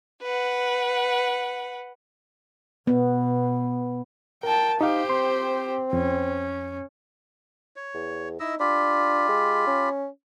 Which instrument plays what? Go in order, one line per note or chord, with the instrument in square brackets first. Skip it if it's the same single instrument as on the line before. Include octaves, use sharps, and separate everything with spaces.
[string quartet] B4 F#5
[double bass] B2 [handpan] B3
[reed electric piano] A#4 [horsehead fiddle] G5 A5
[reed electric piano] D#4 F5 [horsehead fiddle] G4 C5
[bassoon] C4 [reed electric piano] C6
[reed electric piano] F2 [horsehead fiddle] C#4
[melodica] C#5
[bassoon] E2
[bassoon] D#4 [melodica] E4 D#5 E6
[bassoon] D4 [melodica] F4 G4 B5
[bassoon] G#3
C#4